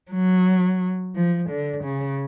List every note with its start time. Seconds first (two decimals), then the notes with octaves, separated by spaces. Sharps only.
0.11 F#3
1.15 F3
1.50 D3
1.84 C#3